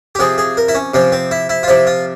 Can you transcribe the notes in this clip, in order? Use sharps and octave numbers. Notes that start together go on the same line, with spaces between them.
G4
C3 F3 G#4
G#4
A#4
E4
C#4
C3 F3 C#4
C4
E4
E4
F4
C3 F3 E4
F4